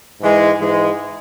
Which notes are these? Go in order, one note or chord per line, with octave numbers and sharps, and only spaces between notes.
G#2 E3 G#3
G#2 E3 G#3